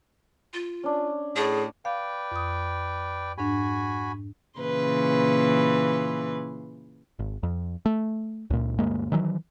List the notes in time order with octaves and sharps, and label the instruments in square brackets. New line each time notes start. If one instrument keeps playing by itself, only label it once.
[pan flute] F4
[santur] C#4 D4
[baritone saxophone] A2 [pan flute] G#4
[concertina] B4 D5 G5 [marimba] F5
[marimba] F2 D#6
[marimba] G#2 D4 [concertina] F#4 G#5 B5
[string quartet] A#2 C#3 E3 B4 C6
[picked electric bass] G#1
F2
A3
C#2 A#2
D2 G2 G#3 A#3
D#3 E3 F#3